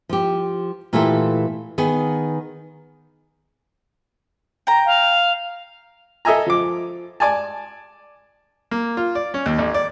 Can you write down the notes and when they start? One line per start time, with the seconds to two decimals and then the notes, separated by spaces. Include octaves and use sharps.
0.09 F3 G4
0.93 A#2 E3 A3 F4 G4 A4
1.78 D#3 B3 G#4
4.67 G5 A#5
4.86 F5
6.25 A4 D#5 E5 G#5 A#5
6.46 F3 D6
7.20 D5 G#5 A5
8.71 A#3
8.97 F4
9.15 D5
9.34 C#4
9.46 D#2
9.58 A1
9.74 D5